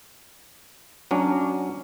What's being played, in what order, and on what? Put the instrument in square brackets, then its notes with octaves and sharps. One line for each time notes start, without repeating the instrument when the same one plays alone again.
[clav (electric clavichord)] F#3 C#4 D4